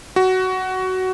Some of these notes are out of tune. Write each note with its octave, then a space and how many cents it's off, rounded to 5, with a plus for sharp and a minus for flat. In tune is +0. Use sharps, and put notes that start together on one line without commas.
F#4 +15